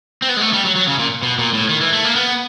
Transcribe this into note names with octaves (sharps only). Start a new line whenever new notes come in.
C4
B3
G#3
A3
G3
F#3
F#3
C#3
A#2
B2
A#2
A2
D#3
E3
A3
A#3
B3